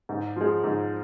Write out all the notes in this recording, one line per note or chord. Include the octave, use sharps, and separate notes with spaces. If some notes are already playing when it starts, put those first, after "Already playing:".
G#2
F3 G#3
G#2